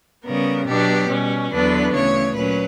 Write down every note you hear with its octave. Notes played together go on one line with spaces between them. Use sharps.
C#3 G3 B3 A#4
B2 F#3 B3 D4 G4
B2 G3 C#4
E2 D3 F#3 B3 D4 B4
D2 C#3 E3 C#5
A#2 F#3 C#4 B4